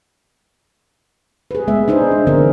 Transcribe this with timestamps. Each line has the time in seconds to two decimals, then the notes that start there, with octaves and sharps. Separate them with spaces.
1.51 G#4 B4
1.68 G#3 B3 E5
1.88 D4 D#4 G#4 C5
2.11 D4
2.27 D3 E3 B3 C4 A#4